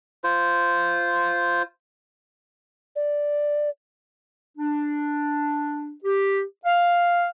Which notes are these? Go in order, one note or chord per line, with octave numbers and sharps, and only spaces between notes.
F4 C5
D5
D4
G4
F5